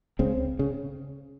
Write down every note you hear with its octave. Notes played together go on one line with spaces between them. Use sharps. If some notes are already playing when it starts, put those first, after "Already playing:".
C#2 C#3 C4
C#3